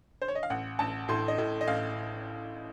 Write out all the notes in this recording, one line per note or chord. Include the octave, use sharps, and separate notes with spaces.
C5
C#5
D#5
F5
A1 F#5
A1 A5
A2 C6
D#5
A2
D#5
A1 F5